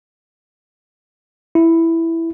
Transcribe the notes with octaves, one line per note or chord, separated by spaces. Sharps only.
E4